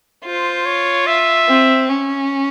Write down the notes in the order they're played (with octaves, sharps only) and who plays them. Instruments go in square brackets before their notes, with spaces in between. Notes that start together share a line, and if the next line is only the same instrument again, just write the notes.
[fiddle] F4 [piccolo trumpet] C5
[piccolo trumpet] C#5
E5
[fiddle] C4
C#4